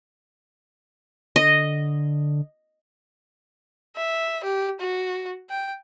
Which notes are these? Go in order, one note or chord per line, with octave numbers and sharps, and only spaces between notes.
D3 D#5
E5
G4
F#4
G5